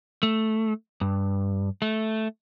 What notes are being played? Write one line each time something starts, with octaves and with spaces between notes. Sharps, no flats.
A3
G2
A3